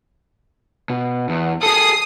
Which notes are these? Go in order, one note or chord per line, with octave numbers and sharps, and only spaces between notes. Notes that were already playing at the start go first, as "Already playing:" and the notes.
B2
E2
G#4 A4 D#6 C7